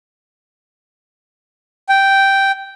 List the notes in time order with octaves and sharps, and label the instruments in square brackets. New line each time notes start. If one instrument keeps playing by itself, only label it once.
[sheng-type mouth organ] G5